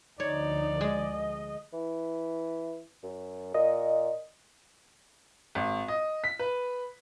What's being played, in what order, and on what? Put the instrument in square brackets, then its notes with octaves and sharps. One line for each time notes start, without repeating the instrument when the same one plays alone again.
[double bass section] D2 D3 F3 [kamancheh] D#4 [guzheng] C#5 [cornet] D5
[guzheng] G#3 [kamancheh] D#5
[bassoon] E3
F#2
[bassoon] A#2 [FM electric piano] D#5
[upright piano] G#1
D#5
B6
B4